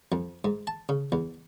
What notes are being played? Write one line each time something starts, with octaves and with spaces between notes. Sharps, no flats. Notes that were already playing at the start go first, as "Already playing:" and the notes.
F2
G#2
A5
C#3
E2